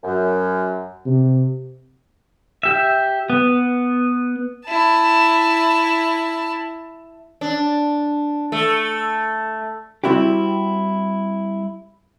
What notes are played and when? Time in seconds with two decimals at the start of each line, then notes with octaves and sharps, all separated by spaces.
0.03 F#2
1.06 C3
2.63 G4 E5
3.30 B3
4.66 E4 A5
7.41 D4
8.52 A3
10.04 G3 C4 E4 F#4 G4